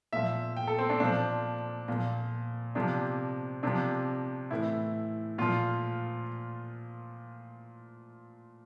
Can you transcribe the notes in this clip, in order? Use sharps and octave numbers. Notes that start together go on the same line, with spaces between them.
A#2 F3 E5
G5
A4
C4
D4
A#2 F3 D4
A#2 F3
C3 F3 D4
C3 F3 D4
A2 E3 E4
A#2 F3 F4